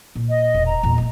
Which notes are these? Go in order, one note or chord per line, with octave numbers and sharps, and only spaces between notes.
A#2
D#5
E1
A#5
E2 A#2
G#3 A3